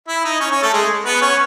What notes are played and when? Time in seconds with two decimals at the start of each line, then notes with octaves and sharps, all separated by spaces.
0.08 E4 E5
0.24 D#4 D#5
0.40 C#4 C#5
0.51 C#4 C#5
0.62 A3 A4
0.73 G#3 G#4
1.05 B3 B4
1.21 C#4 C#5